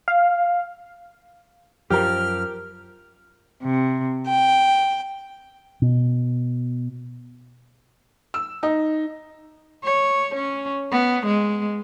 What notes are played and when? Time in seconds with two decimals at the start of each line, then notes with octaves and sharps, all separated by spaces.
0.08 F5
1.90 F#2 F3 G4 A#4 F6
3.63 C3
4.27 G5
5.82 B2
8.34 E6
8.63 D#4
9.84 C#5
10.35 C#4
10.92 B3
11.26 G#3